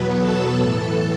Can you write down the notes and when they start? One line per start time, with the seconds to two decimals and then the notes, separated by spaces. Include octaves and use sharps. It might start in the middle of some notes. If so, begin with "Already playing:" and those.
Already playing: E2 B2 F#3 B3 B4
0.19 A4 A5
0.58 A2 E3 A4 A5